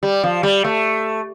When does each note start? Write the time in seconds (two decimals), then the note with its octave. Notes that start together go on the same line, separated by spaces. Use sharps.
0.03 G3
0.23 F3
0.43 G3
0.64 A3